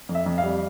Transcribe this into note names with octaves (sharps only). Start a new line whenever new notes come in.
F2
E5
F2
F5
G3